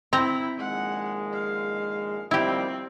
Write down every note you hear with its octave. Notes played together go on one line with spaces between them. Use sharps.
C4 E4 A#5
A#1 D#3 G#3 F#5
F5
D#2 F3 G3 C4 E4 G4